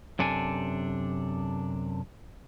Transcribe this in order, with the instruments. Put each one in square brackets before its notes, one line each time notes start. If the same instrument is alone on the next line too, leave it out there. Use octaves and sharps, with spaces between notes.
[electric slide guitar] F#2 C3 D4 A4 G#5